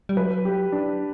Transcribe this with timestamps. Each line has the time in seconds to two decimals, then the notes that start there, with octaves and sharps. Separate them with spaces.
0.09 G3
0.17 F#3 B4
0.45 G4
0.72 D4